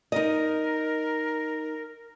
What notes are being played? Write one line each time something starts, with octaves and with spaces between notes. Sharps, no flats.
D#4 A#4 D#5